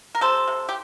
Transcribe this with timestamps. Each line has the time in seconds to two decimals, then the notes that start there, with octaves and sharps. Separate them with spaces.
0.15 A#4
0.21 G3 A4 C5
0.48 C3
0.69 G4